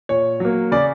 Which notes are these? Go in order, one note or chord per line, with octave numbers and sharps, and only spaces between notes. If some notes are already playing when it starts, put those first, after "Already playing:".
A#2 C#5
F#3 A#3
C#3 D5